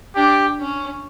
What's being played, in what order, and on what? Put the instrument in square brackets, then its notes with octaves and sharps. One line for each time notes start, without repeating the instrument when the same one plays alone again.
[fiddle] D4 [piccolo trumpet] G4
[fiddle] C#4